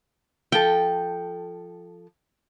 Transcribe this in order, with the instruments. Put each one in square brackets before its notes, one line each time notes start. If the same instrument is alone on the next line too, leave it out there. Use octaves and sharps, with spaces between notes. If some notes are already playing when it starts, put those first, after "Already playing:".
[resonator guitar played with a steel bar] F3 A4 [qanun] G5